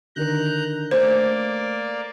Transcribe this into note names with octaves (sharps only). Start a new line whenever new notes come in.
D3 D#3 A#4 A#5 F#6 G6
A3 A#3 C5 D5